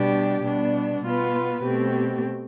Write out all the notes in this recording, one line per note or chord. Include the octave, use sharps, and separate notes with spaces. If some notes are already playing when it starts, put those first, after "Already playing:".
Already playing: B2 G3 B3 D4 G4
B2 G3 B3 D4
B2 B3 F4 B4
B2 A3 C4 G4